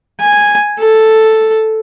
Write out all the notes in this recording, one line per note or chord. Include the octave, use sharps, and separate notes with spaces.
G#5
A4